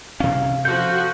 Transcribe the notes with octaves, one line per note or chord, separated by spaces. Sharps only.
C3 C#4 F5
F3 F#4 A4 F5 G6